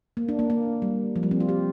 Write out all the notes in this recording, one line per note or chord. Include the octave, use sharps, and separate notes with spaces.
A#3
D4
A#3
A#3
G3
F3
G3
C4
F4
G4